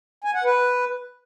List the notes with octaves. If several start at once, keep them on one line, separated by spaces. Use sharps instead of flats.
G#5
F#5
B4